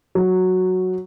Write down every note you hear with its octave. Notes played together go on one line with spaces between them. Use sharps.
F#3